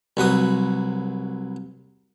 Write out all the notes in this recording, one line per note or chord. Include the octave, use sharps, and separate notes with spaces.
C2 F#3 B4 D#6